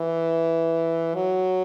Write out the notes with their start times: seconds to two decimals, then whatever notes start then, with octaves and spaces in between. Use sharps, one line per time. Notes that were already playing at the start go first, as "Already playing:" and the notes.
Already playing: E3
1.14 F#3